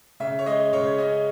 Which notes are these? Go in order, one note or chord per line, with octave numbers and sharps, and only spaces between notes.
C#3 E5
C#5
G#3 D#5
C#3 C#5
C#4 D#5